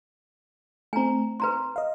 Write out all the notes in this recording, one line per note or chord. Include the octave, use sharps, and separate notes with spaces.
A3 C4 G#5 A#5
B4 A#5 C6
D#5 F5